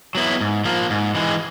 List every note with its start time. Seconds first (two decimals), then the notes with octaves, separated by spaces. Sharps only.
0.15 F#3 B3 E4
0.41 G#2
0.65 F3 A#3
0.90 G#2
1.15 E3 G#3